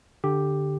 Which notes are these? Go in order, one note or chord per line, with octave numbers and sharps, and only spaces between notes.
D3 G4